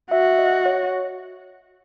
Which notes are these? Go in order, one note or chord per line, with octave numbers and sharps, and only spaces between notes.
F#4 E5
D#5
C#5